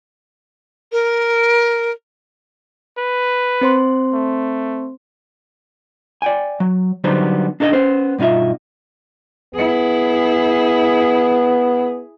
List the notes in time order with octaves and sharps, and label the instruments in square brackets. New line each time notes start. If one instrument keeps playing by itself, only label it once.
[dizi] A#4
[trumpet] B4
[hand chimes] C4 C5 C6
[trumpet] A3
[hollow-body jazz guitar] D5 G5 G#5
F#3
D3 F#3 G3 B3 D#4 C5
D4 D#4 A4 C#5 D#5
B3 C#4 C5
G2 B2 D#4 F4 E5
[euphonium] B3 [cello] E4 G#4